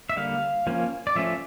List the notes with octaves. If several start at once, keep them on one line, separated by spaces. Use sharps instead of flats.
E5
D3 G3 A#3 F5
F3 A#3 C#4
D5
F3 A3 C#4 E5